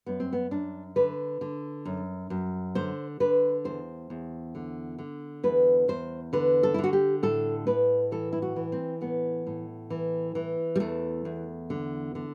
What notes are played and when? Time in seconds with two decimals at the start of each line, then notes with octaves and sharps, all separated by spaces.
0.06 F#2 B3
0.20 C4
0.33 B3
0.51 F#2 D4
0.96 D3 B4
1.41 D3
1.85 F#2
2.30 F#2
2.75 D3 C5
3.20 D3 B4
3.64 E2 C5
4.10 E2
4.55 D3
4.99 D3
5.43 E2 B4
5.88 E2 C5
6.33 D3 B4
6.63 A4
6.74 E4
6.78 D3
6.84 F#4
6.93 G4
7.23 A2 A4
7.67 A2 B4
8.12 E3 A4
8.33 E4
8.42 F#4
8.56 E3
8.72 C4
9.01 A2 B3
9.47 A2
9.90 E3
10.35 E3
10.76 G3
10.80 E2 A3
11.25 E2
11.70 D3
12.15 D3